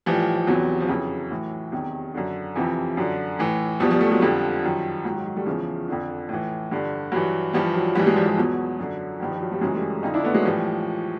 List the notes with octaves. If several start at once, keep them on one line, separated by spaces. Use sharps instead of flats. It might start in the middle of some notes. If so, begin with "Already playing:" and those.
A2 E3 F3 G3
F3
E2 C3 E3 F#3
F3
F2 C#3 E3 F#3
A2 E3
E2 C3 D#3
F#2 D3
F2 C3 E3 F3
F#2 D3
A2 E3
E2 B2 F3 G3
F3 G3
G3 A3
F#3 G#3
F2 D3 F3 G3
F#2 D#3
G#2 D#3 F#3
F#3
F#3
G3 A3
E2 C#3 E3 F3
F2 D3
A2 E3
G2 D3
G2 E3 F#3
G2 E3 F3 G3
F#3
G#2 E3 F3 G3
F#3 G#3
F3 G3
F3 G3
E2 B2 F#3
F#2 D3
G2 D#3 F3
F3
F#3
F3 G3
F#2 C#3 E3 F#3 G#3
G3 A3
F2 D3 D#4 F4
D4 E4
A3 B3
F#3 G#3
A2 E3 F3 G3